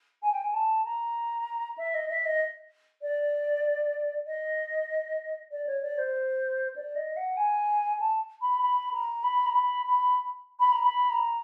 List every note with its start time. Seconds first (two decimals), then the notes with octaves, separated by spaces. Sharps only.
0.22 G#5
0.32 G5
0.42 G#5
0.53 A5
0.85 A#5
1.77 E5
1.94 D#5
2.09 E5
2.25 D#5
3.02 D5
4.26 D#5
5.51 D5
5.66 C#5
5.82 D5
5.98 C5
6.76 D5
6.95 D#5
7.16 F#5
7.37 G#5
7.99 A5
8.41 B5
8.61 B5
8.93 A#5
9.23 B5
9.46 A#5
9.54 B5
9.85 B5
10.59 B5
10.72 A#5
10.85 B5
11.09 A#5